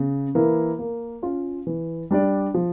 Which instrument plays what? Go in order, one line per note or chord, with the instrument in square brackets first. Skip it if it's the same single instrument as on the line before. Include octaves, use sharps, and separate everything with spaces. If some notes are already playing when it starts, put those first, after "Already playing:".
Already playing: [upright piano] C#3
E3 A#3 E4
A#3
C#4 F4
E3
G3 D4 G4 D5
F3